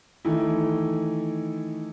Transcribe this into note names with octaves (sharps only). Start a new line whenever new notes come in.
D#3 E3 A3 E4